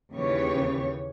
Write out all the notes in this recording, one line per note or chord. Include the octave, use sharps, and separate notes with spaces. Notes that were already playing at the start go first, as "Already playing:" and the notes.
D#2 C#3 E3 G4 C#5